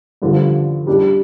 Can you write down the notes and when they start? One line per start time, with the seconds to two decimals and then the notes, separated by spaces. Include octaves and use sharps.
0.22 G2 D3 F3
0.87 G3 D4 G4